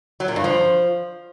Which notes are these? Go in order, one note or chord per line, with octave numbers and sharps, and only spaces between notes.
F#3
A#2
G2
F3